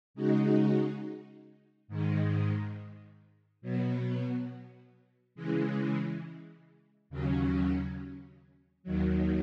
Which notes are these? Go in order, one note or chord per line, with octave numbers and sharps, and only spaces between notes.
C#3 G#3 D#4 F#4
G#2 D#3 G#3
B2 F#3 B3
C#3 E3 G#3
D#2 C#3 F#3 C#4
D#2 D#3 F#3